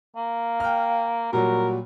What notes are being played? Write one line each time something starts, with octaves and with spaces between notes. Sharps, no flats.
A#3 F5
G5 F6
A#2 F#3 G3 F#4 A#4